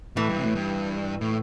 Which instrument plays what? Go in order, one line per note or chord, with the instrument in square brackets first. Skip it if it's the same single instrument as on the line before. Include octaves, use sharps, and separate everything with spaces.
[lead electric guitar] A2 [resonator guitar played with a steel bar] E3
[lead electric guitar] G2
C3
A2
G2
A2